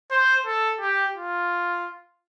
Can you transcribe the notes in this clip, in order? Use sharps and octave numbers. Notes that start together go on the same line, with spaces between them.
C5
A4
G4
F4